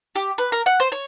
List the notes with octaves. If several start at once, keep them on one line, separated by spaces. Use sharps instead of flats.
G4
B4
A#4
F#5
C5
C#5